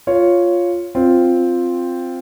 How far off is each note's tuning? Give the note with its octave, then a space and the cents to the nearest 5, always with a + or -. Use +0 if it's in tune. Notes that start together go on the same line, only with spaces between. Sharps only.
F4 +0 C#5 +0
C4 +0 F4 +0